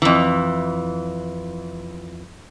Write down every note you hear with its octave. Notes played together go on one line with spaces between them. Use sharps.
F2 E3